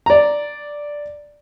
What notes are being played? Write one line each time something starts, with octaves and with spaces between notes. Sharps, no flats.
D5 A#5